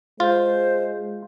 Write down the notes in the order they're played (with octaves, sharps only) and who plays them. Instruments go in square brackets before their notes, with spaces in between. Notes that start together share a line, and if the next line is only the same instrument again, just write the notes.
[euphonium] G#3 [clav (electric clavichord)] F4 [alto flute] C5